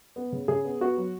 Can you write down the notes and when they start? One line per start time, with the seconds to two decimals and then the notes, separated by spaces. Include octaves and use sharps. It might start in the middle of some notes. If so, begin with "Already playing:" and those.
0.16 B3
0.32 C#3
0.48 C#3 G#4
0.65 B3
0.81 B3 F#4
0.97 F#3